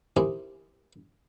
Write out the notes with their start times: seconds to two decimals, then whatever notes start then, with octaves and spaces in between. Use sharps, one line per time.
0.16 C4 D#4 E4 G4 G#4 A#4